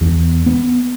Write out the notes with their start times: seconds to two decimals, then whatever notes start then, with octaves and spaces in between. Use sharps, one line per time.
0.01 E2
0.46 B3